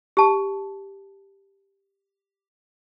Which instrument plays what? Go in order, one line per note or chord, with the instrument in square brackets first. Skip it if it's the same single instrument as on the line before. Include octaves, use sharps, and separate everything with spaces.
[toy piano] G4 A5